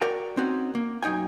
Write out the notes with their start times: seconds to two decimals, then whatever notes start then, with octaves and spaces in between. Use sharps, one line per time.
0.01 F#4 A#4 D5 G5
0.37 C4 C#4 D#4 F#4
0.75 A#3
1.03 B1 F#2 D#4 G5 G#5